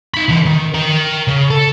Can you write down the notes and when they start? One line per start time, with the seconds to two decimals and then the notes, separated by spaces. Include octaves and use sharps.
0.14 D#4 B5
0.29 D3 E3
0.46 D#3
0.74 A#4 G5
1.27 C#3
1.50 A4